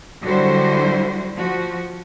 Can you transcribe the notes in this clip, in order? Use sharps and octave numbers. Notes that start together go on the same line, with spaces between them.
D3 F#3 G3 E4 F#4 C5
F3 F#4